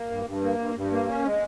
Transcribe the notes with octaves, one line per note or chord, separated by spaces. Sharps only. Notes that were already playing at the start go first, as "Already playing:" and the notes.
Already playing: A#3
G2
G2
A#3
G2
G2
A#3
C#4
G#3